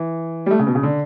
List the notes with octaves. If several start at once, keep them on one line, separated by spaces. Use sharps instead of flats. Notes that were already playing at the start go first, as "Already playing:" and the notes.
Already playing: E3
G3
A3
C#3
B2
C#3
D3